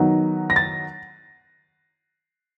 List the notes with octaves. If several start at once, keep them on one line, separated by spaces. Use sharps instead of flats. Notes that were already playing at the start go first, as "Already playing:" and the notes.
Already playing: D#3 F#3 B3 D#4
A#6
A6